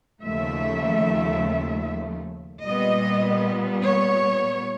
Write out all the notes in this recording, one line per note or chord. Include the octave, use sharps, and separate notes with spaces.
D#2 C#3 F3 A3 E5
A#2 G3 B3 D#5
C#5